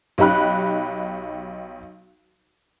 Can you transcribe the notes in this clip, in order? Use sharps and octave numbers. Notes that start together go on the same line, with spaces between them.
B1 D#4 G4 B5 F#6